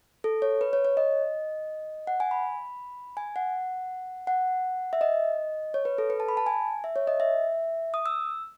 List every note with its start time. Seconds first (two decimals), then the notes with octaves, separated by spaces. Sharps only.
0.24 A4
0.42 C#5
0.61 B4
0.73 C#5
0.85 C#5
0.97 D#5
2.07 F#5
2.20 G#5
2.31 B5
3.17 G#5
3.36 F#5
4.27 F#5
4.93 E5
5.01 D#5
5.74 C#5
5.85 B4
5.98 A4
6.10 B4
6.20 A5
6.29 B5
6.37 A5
6.46 G#5
6.84 E5
6.96 C#5
7.07 D#5
7.20 E5
7.94 D#6
8.06 E6